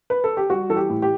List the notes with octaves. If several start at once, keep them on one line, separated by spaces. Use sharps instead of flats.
B4
A4
G4
G3 F#4
E3 A4
G4
A2
G4